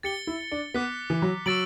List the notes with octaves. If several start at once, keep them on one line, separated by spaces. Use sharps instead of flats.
G4 A6 C#7 G7
E4
D4
B3 D6 F#6 B6
E3
F#3
F#3 C#6 E6 A6 D7 F#7